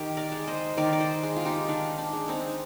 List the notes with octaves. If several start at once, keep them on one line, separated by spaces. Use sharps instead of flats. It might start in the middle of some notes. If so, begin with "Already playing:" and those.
Already playing: D#3 G4
A#4 D5
G#3
C5 D#5
D#3 A#4 D5
D5
C5 D#5
G#3
F4
D#4 G4
D#3 D4
D4
G#3
C4 D#4